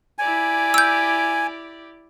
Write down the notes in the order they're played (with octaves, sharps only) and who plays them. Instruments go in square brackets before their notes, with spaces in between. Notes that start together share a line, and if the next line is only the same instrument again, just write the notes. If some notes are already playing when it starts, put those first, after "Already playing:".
[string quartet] E4 G4 D5 [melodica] G#5
[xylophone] E6 G6